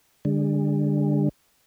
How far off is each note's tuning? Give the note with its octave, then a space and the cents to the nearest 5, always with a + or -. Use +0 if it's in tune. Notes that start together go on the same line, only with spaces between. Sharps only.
D3 +0 G#3 -45